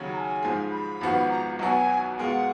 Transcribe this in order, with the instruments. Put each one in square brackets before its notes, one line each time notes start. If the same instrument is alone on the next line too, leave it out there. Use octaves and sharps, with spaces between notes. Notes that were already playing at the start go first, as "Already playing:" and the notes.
Already playing: [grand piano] D#2 C#3 F#3 C#4
[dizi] A#5
G#5
[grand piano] G#2 F3 G#3
[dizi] B5
[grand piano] G#1 G#2 F3 B3 F#4
[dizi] A#5
[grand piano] B1 B2 F#3 B3 F#4 [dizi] G#5 A#5
[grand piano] B2 G#3 B3 F4 A#4 [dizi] F#5 G#5